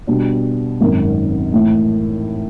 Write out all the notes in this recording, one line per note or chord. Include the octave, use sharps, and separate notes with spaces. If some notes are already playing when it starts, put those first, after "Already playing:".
B2 G3 B3 D4
G#1 F#2 D#3
A2 E3 A3